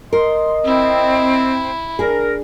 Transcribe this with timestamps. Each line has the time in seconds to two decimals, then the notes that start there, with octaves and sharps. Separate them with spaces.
0.13 A#4 D#5 C6
0.65 C4 E4
1.99 D4 G#4 A#4